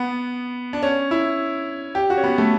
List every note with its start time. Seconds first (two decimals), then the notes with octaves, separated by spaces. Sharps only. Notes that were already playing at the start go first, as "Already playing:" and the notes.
Already playing: B3
0.73 D4
0.83 C#4
1.11 E4
1.95 G4
2.10 F#4
2.17 C#4
2.24 B3
2.38 A3